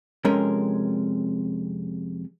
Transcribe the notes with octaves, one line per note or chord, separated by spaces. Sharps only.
F2 C3 G#3 C#4 A#4